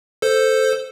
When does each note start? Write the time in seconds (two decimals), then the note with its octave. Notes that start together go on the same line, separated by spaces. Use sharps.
0.22 A4 C5